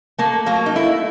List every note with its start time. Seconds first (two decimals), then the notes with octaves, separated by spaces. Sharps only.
0.18 A3 A#3
0.46 F#3 A#3
0.66 D#4
0.75 A3 E4